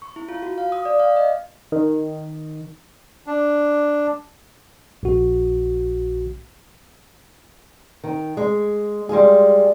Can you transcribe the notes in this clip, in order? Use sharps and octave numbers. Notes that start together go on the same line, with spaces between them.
C#6
E4
F4
F#4
F5
D#6
D5
F5
D#5
D#3
D4
A#1 F#4
D#3
G#3
G3 G#3 F4 G#4